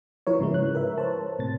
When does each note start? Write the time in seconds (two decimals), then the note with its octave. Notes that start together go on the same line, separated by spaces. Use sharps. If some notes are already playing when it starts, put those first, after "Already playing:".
0.27 F3 E4 A#4 B4 C#5
0.39 G#2 C#3 F3 G#3
0.54 F#6
0.75 A#4 B4 E5
0.98 C5 C#5 A5
1.39 A2 C3 A6